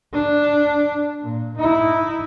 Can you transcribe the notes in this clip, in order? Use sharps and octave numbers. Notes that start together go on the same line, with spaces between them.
D4
A#2
D#4 E4